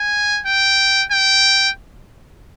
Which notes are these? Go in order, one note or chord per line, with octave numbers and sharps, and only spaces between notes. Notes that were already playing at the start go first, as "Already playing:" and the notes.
Already playing: G#5
G5
G5